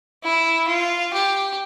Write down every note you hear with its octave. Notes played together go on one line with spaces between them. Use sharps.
E4
F4
G4